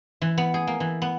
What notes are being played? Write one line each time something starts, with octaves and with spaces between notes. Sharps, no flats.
E3
B3
G#4
A#3
E3
B3